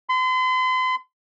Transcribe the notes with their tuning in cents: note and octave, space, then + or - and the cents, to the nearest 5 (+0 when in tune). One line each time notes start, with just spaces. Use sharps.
C6 -40